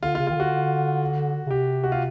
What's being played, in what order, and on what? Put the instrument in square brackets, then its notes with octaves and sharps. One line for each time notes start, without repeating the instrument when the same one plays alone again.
[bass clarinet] D3 [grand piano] F4
[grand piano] F4
[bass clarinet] C#3
[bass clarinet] D#3 [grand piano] F4
[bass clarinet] D3 [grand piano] F#4
[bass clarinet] C#3
[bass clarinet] C3 [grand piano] G4
[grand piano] F#4
F4